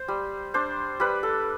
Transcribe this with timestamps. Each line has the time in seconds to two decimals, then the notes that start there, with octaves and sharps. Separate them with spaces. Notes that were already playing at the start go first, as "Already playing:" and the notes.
Already playing: C5
0.08 G3
0.54 D4 C5
1.00 G3 B4
1.23 A4